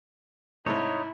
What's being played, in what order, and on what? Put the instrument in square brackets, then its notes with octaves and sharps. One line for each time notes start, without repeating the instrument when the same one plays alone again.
[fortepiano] G#2 C3 A3 [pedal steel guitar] D#4 C#5 [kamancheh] E4